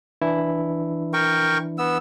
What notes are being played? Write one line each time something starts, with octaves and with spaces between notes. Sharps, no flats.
E3 D4 E4
A#4 G5 C#6
B3 E6